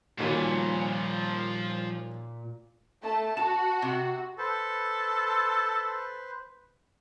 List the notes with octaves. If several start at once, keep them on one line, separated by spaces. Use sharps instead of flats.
D#2 A#2 F3 G3 A#3 F#4 G#5 C6
A3 A5
F#4 A5
C3
A4 B4 C5